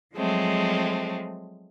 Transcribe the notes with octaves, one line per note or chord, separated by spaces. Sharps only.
F3 F#3 G#3 A3 C4